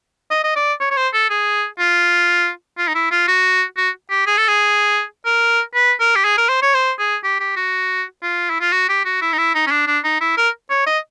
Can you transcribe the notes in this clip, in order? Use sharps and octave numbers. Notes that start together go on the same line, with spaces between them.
D#5
D#5
D5
C#5
C#5
C5
A4
G#4
F4
F4
D#4
E4
F4
F#4
F#4
G4
G#4
A4
G#4
A#4
B4
A#4
G4
G#4
A#4
C5
C#5
C5
G#4
G4
G4
F#4
F4
E4
F4
F#4
G4
F#4
E4
D#4
E4
D#4
C#4
D4
D4
D#4
E4
A#4
C#5
D#5